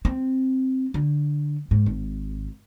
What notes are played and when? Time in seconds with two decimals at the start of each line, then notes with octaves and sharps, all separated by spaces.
0.05 C4
0.94 D3
1.71 G#2
1.86 G#1